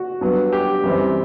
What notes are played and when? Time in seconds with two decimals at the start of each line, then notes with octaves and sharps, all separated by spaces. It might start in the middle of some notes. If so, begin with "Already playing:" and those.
Already playing: F#4
0.21 G2 F#3 B3
0.53 G4
0.83 F#2 E3 G3 C4